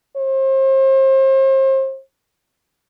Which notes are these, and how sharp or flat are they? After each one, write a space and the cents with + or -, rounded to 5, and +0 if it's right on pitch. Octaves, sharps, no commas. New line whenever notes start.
C5 +35